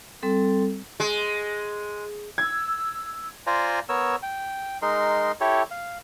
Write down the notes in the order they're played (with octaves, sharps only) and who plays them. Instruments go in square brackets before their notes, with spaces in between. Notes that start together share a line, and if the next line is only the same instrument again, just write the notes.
[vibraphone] G3 C4 A4
[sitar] G#3
[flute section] E6 [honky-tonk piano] G#6
[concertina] F4 C5 D5 G#5 A#5
B3 A#4 C#5 E6
G5
G#3 D#4 A#4 C6
E4 G4 A4 C#5
F5